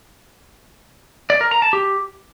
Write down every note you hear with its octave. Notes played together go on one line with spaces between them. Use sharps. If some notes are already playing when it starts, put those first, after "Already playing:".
D5
A#4
A#5
A5
G4